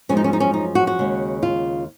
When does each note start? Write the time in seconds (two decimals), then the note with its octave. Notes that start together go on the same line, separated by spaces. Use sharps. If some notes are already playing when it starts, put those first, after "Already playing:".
0.09 F#2 F3 G#3 C#4
0.17 D#4
0.24 C#4
0.33 D#4
0.40 C#4
0.54 D#4
0.75 F#4
0.87 F#4
0.99 D#2 C#3 G#3
1.43 F4